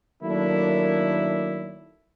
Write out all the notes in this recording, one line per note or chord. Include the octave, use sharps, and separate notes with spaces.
D#3 F#3 A3 A#3 D4 E4